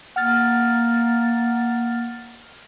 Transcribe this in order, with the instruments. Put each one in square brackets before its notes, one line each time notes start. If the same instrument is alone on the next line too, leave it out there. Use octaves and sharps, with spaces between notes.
[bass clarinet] A#3 [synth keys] F#5 F6 A6